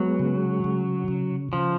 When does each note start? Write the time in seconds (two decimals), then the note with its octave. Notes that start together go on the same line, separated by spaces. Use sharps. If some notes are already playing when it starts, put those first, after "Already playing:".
Already playing: F#3 G#3 B3
0.19 C#3
0.64 C#3
1.08 C#3
1.53 C#3 F3